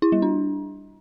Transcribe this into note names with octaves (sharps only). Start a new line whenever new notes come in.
E4
G3
D4